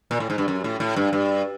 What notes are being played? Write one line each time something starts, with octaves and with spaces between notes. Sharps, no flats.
A#2
A2
G#2
G2
F#2
A2
A2
G2
G2